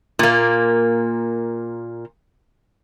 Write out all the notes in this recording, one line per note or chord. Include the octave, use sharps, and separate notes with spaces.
A#2 A#3